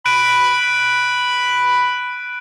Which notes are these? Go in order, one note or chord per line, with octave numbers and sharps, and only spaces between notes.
B5 F#6 D7 D#7